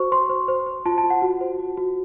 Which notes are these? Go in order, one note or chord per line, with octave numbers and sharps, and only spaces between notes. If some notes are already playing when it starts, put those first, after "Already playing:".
Already playing: F#4 C5 C#6
C5 C6
C5
C5
C5
F4 A5
A5
F4
F#5
F#4
C5
F#4
F#4